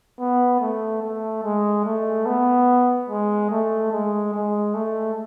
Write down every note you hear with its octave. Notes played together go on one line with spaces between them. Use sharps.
B3
A3
A3
G#3
A3
B3
G#3
A3
G#3
G#3
A3